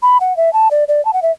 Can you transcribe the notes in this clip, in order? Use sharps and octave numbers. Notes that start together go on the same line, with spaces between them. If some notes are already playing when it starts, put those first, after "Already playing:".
B5
F#5
E5
A5
D5
D5
A5
F#5
E5